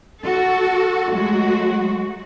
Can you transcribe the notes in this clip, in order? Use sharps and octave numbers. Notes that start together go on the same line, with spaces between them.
F#4 A4
F#3 G#3 A3 F#4